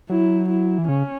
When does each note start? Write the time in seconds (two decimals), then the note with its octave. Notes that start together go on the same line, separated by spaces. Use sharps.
0.10 F#3 E4
0.49 E4
0.78 E3
0.88 C#3 C#4